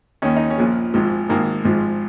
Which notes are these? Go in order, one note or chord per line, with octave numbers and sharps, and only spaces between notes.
D#2 D#3 C#4
D#4
C#4
A#1 A#2 F3
G#1 G#2 F3
G#1 G#2 D#3 A#3
G#1 G#2 F3